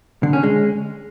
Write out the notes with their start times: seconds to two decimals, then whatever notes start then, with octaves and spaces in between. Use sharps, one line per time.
0.23 D3
0.33 C#4
0.43 G#3